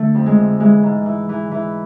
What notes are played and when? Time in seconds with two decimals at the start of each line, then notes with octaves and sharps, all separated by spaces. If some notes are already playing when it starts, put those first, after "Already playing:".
Already playing: D3 A3
0.15 F2
0.26 G#3
0.38 D3
0.60 E3 G#3
0.83 G#2
1.06 E3
1.29 E3
1.52 E3